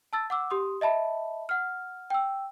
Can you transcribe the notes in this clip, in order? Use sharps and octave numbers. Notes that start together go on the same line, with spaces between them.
A5 E6 A6
F#5 D6 E6
G4 C6 D#6
D#5 E5 A5 B5
F#5 F6
G5 E6